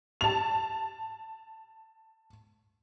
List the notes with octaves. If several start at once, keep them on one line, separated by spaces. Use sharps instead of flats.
A5 F7